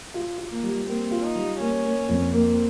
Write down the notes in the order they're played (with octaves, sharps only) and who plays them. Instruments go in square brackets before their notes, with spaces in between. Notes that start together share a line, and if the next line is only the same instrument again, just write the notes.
[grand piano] F4
F4
[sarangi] A#3
[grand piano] G3
[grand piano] A#3 [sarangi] C4
[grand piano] F4
[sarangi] D#4
[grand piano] G3
[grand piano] A#3 [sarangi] C#4
[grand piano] A#3
F2
[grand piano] A#3 [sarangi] C4